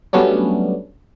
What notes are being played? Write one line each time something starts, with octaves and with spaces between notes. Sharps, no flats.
F#3 G3 A3 B3 C#4 D4